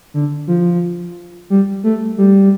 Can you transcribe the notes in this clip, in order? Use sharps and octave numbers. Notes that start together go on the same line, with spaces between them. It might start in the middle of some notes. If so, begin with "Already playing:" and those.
D3
F3
G3
A3
G3